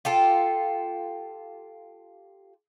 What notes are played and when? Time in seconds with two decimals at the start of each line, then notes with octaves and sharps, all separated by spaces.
0.05 F4 G4 A4